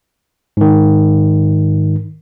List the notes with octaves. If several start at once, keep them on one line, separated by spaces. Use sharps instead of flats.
G#2 D#3